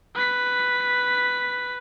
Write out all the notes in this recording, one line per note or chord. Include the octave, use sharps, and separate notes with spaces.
B4 B6